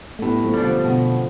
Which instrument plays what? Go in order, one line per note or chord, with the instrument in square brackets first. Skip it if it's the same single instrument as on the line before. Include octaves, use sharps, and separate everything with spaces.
[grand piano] A3
[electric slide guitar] A2 [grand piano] G3 B3
[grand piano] F3 A3
[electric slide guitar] G3 D4
[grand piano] D3 F3
[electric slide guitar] B2